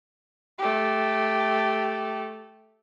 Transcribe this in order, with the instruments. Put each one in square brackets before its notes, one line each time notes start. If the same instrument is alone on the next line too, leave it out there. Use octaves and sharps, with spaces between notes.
[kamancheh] A3 G4